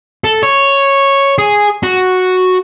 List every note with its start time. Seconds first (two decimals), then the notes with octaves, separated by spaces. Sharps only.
0.24 A4
0.43 C#5
1.38 G#4
1.83 F#4